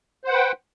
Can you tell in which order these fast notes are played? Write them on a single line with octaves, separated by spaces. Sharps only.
C5 F#5 B4 G5